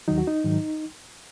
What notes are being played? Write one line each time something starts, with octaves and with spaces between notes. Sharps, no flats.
D#2 D#3 F#3 D#4
F#4
D#4
G#2 D#3 F#3